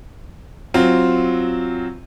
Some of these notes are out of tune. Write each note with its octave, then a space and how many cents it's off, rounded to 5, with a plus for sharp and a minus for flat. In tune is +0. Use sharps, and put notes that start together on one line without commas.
F#3 +0 C4 +0 F4 +0